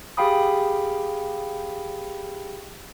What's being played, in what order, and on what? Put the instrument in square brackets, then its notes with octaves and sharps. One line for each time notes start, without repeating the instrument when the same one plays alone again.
[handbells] G4 G#4 F5 G5 B5 D#6